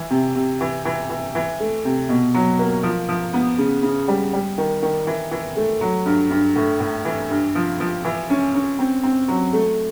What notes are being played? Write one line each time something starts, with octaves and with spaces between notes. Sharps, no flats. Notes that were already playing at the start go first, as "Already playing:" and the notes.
Already playing: E3
C3
C3
E3
E3
E3
E3
A3
C3
B2
F#3
A#3
F3
F3
B3
C#3
C#3
G3
G3
D#3
D#3
E3
E3
A3
F#3
G2
G2
A2
A2
E3
G2
F3
F3
E3
C#4
C#4
C4
C4
F#3
A3